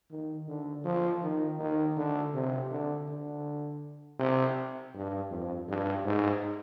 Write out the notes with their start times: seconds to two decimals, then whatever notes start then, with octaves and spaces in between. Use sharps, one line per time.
0.11 D#3
0.48 D3
0.85 F3
1.22 D#3
1.60 D#3
1.97 D3
2.34 C3
2.71 D3
3.08 D3
4.20 C3
4.95 G2
5.31 F2
5.69 G2
6.05 G#2